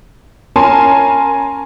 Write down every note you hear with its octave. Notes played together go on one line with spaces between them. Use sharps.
C#4 A#4 G#5 A5 C6